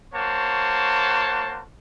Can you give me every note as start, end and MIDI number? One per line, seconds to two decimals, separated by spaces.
0.14 1.63 58
0.14 1.63 66
0.14 1.63 72
0.14 1.63 73
0.14 1.63 81